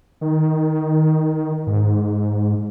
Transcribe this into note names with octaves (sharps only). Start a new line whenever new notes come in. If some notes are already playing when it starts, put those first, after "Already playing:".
D#3
G#2